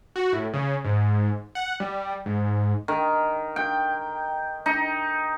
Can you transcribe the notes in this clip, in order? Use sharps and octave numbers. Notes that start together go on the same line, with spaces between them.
F#4
A2
C#3
G#2
F#5
G3
G#2
D#3
G5
D#4